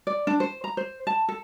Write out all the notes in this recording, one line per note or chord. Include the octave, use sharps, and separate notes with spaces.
D5
D4
C5
A#5
C5
A5
A4